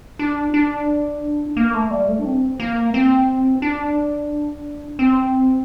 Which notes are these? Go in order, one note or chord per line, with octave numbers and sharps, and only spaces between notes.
D4
D4
A#3
A3
G3
A3
D4
C4
A#3
C4
D4
C4